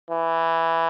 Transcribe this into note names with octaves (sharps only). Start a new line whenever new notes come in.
E3